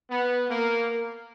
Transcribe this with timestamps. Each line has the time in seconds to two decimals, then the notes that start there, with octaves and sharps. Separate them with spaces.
0.11 B3
0.50 A#3